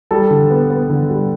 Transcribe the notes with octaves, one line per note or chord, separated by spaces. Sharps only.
G3 A4 A5
D3
B3
B3
D3
G3